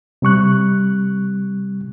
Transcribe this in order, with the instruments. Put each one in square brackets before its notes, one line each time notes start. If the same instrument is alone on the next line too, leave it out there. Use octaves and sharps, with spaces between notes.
[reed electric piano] C3 G3 C#6 F#6